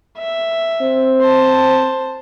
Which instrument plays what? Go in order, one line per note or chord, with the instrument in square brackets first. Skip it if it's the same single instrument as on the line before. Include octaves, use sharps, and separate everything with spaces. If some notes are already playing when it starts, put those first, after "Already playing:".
[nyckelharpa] E5
[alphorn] C4
[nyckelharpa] C5 A5